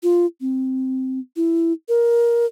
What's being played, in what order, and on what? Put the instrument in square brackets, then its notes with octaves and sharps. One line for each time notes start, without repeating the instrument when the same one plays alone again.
[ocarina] F4
C4
E4
A#4